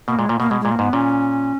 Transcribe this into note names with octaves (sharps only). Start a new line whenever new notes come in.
B2 A#3
A#2 G#3
A#2 A#3
B2 A#3
B2 G#3
A#2 G#3
A#3
G#2 B3
A#2 C#4